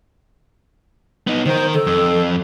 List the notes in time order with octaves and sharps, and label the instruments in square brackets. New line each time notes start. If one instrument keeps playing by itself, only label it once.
[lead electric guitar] B3 D#4
[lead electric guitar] D#3 A#4 [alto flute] C5
[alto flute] A4
[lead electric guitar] F2